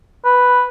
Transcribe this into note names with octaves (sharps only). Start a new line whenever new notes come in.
B4